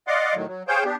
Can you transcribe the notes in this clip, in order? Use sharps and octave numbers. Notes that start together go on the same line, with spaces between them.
D5 D#5 F5 F#5 C6 D6
A2 D#3 F#3
F#3
G#4 C5 C#5 F5 G5 G6
B3 D4 G4